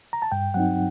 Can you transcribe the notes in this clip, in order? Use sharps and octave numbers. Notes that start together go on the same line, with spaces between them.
A#5
A5
G2 G5
F#3 C4 D#4 F#5